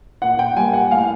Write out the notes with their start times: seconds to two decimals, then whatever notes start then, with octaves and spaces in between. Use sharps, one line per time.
0.22 A#2 F#5
0.39 G5
0.56 G3 A#3 G#5
0.73 F#5
0.91 A2 F5